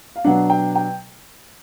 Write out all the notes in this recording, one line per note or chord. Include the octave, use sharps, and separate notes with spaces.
F5
B2 F#3 B3 D4 F#5
G5
G5